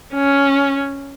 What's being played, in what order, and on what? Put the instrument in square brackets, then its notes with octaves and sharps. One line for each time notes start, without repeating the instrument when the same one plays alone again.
[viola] C#4